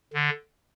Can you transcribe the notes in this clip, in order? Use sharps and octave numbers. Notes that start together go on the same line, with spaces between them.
D3